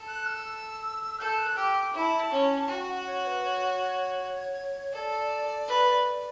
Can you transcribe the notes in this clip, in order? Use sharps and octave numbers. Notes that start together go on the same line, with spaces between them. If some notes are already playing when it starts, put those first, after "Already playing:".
Already playing: A4
F#6
E6
A4 G6
F#6
G4 E6
D6
E4 A5 B5
C#4
F#4 G5
F#5
C#5
B4
C#5
A4 D5
B4